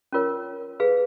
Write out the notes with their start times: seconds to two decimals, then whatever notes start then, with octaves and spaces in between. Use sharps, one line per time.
0.13 C#4 F4 A#4 C#5
0.80 G#4 B4 F5